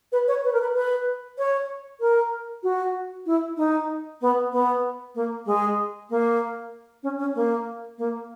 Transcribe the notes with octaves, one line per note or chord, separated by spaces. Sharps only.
B4
C#5
B4
A#4
B4
B4
C#5
A#4
F#4
E4
D#4
B3
B3
A#3
G#3
A#3
C#4
C#4
A#3
A#3